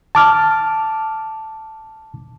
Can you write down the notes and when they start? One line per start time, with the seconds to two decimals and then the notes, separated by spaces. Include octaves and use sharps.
0.15 A5 D6 F6